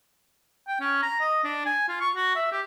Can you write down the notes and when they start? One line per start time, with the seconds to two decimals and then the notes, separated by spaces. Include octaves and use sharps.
0.67 G5
0.80 C#4
1.02 A#5
1.20 D#5
1.44 D4
1.66 G#5
1.88 F4
2.01 C#6
2.15 F#4
2.36 E5
2.52 G4